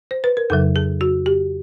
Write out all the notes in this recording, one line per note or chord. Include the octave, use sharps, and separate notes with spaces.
C5
B4
A#4
F2 C#3 F#3 A4
G#4
F#4
G4